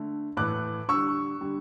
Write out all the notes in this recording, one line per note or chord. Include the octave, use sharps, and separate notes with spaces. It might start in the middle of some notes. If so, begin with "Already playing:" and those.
Already playing: D3 A3
A2 E3 A3 D6 F#6
D3 G3 C#6 E6
D3 G3